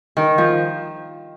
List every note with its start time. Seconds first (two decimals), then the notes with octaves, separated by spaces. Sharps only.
0.17 D#3
0.38 F3